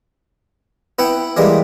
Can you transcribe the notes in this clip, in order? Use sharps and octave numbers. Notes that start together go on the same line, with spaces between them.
B3 E4 F#5 G5
E3 G3 G#3 A#3